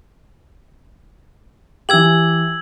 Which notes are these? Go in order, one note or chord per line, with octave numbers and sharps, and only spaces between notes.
E3 G4 E6 G#6 F#7